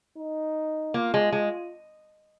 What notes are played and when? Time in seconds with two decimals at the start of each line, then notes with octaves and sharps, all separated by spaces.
0.18 D#4
0.94 A#3 F4
1.14 G#3
1.32 G#3